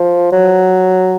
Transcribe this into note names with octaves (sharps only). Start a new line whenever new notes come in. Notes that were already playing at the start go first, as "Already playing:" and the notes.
Already playing: F3
F#3